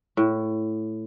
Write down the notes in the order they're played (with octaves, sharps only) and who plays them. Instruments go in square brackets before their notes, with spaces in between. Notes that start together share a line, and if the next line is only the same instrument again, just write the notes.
[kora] A2